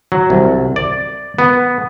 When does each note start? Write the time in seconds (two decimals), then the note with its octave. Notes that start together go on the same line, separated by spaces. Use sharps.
0.12 F#3
0.30 C2
0.76 D5
1.39 B3